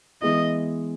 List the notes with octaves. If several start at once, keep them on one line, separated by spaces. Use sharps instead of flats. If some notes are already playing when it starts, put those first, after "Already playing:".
E3 G#3 B3 E4 D#5